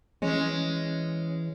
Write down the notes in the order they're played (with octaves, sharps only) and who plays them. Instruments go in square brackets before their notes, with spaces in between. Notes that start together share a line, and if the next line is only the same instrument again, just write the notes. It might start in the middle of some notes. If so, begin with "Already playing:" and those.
[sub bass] E3 [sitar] G#3 C#4